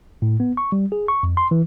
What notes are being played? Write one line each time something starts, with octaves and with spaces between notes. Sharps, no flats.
A2
B3
C#6
G3
G#4
C#6
F2
C6
E3